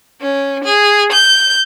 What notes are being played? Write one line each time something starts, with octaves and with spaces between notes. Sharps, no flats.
C#4
G#4
G6